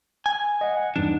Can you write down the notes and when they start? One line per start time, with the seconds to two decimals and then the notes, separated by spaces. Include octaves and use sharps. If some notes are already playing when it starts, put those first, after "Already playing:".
0.26 G#5
0.61 D#5 F#5
0.77 F#5
0.96 E2 G2 D4 D#4